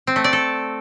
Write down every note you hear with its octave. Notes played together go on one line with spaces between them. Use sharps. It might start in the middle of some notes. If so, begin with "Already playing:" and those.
C4
A3
D5
A4